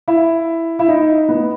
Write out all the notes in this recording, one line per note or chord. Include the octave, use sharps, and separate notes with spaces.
E4
E4
D#4
B3